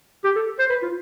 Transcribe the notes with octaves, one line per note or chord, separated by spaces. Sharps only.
G4
A4
C5
B4
F4